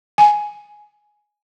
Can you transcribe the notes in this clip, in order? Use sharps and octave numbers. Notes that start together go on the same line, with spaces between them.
G#5